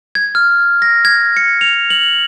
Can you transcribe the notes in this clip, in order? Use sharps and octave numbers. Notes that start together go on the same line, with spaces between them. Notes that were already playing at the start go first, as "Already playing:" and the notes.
G#6
F6
A#6
G#6
C#7
F7
F#7